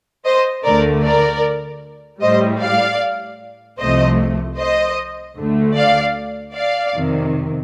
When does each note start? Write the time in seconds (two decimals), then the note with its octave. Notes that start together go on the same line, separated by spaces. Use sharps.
0.25 C5 D#5
0.64 D2 D3 A3 A#4 D5
1.04 A#4 D5
2.22 A2 G3 C5 D#5
2.61 D5 F5
3.79 C2 C3 F3 A3 C5 D#5
4.58 C5 D#5
5.37 D2 D3 A3
5.76 D5 F5
6.55 D5 F5
6.94 F2 C3 D#3